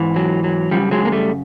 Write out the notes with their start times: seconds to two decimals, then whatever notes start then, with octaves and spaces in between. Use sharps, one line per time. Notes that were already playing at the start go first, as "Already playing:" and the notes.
Already playing: G#2 E3
0.16 F#3
0.44 F#3
0.71 F#2 C#3 F3 G3
0.91 F#3 G#3
1.05 A#3
1.12 G3 A3